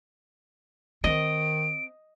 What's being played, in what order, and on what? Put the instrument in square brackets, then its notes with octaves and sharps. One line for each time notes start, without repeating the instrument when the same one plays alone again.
[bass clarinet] D#3 [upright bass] C4 [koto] D#5 [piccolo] D7